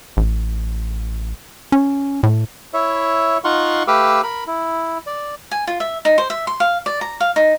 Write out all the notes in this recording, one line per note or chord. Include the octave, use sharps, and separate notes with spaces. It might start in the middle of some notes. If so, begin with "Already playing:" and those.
A1
C#4
A2
E4 C#5 E5
D#4 F4 F5 F#5 C6 C#6
A3 G4 B4 F5 D6 E6
A#4 B5
E4
D5
G#5
F4
E5
D#4
C5
E5
C6
F5
D5
A#5
F5
D#4